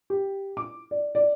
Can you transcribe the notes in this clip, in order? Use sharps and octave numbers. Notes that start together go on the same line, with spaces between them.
G4
D6
D5
D5